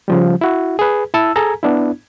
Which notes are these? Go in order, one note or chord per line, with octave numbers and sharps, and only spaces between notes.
C#3 F3 G3
E4 F#4
G#4 B4
E4 A5 E6
G#4 A4 G#5 A#5
B3 D4 E4